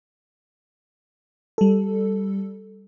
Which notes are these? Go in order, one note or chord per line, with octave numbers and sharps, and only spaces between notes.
G3 A4